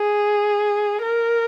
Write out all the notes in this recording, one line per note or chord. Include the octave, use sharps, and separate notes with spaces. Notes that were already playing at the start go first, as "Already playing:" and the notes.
Already playing: G#4
A#4